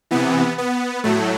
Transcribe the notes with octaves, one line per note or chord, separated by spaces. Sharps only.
C3 E3 B3
B3
A2 F#3 A3